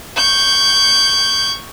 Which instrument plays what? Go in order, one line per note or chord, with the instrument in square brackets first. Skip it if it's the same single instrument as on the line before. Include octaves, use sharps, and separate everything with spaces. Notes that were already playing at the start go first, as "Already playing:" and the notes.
[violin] C#6 G6